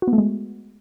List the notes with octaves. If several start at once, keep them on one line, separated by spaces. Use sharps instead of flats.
F#4
B3
A3
G#3